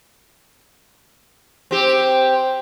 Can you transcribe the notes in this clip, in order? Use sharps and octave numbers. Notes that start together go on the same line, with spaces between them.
C4 G4